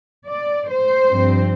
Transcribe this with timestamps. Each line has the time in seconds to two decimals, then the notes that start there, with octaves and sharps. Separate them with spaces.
0.29 D5
0.69 C5
1.09 G2 F3 C4